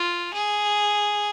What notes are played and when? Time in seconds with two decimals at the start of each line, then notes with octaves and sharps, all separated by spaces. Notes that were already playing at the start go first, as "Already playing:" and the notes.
Already playing: F4
0.33 G#4